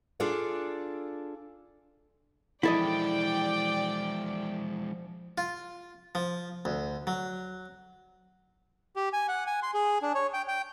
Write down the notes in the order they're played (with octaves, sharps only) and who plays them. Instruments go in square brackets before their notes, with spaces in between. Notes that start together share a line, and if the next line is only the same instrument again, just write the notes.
[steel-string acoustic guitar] D4 F4 G#4 A4 D5
[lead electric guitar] E3 G#3 [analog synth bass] F3 [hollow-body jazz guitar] E4 A4 D#5 [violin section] D5 G5
[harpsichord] F4
F3
D2
F#3
[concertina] G4
G#5
F#5
G#5
C6
G#4
D4
C#5
G5
G5